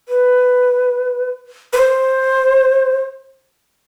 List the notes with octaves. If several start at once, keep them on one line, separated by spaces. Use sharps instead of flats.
B4
B4
C5